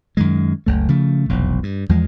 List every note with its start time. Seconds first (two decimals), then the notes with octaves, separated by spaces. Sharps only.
0.17 F#2 D#3 G#3
0.66 F#1 C#2 A3
0.89 C#3 F3 A3
1.29 F1 B1 E2
1.63 G2
1.89 E2 F3 G#3